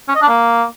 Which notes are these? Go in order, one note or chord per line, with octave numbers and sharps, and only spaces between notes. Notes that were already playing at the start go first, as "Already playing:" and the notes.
C#4
D#5
D4
A#3